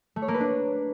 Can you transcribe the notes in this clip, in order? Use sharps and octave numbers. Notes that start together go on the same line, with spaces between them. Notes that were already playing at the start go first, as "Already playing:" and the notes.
A3
C#5
A#3
B4
D4